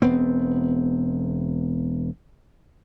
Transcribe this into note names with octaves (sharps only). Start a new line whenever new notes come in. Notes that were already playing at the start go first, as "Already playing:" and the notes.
E1 B3 C4